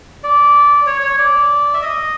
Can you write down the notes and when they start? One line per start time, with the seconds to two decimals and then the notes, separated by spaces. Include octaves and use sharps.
0.23 D5
0.87 C#5
1.02 C#5
1.18 D5
1.74 E5
1.82 D#5